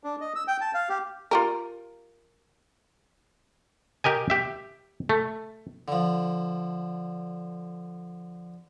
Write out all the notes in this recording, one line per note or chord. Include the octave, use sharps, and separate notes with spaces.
D4
D#5
E6
G5
A5
F5
G4
F4 G4 A#4
G4 A#4 D#5 G#5
G4 E5
A3
D3 F3